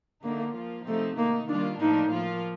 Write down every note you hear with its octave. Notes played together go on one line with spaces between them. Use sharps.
D3 A3 A#3 D#4
F3 A#3 F4
C3 F3 A3 C4 D#4
D#3 A3 A#3 D#4
D#3 G3 A#3 D4 F4
A2 F3 A#3 D4 D#4
F3 A#3 F4